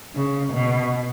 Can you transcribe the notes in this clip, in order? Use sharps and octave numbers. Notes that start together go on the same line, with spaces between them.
C#3
B2